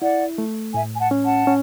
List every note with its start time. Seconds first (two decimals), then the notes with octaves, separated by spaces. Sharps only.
0.01 E4 D5 F#5
0.38 A3
0.74 A2 E5 G#5
0.94 G#5
0.99 F#5 A5
1.11 C#4
1.23 F#5 A5
1.47 C#4